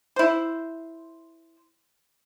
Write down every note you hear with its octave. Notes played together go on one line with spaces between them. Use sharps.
E4 C5